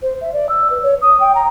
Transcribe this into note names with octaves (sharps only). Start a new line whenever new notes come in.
C5
E5
D5
E6
B4
C#5
D#6
G5
A#5